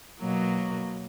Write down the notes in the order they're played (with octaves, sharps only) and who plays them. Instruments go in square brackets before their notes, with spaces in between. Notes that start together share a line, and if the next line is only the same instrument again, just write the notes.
[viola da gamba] B2 F#3 A#3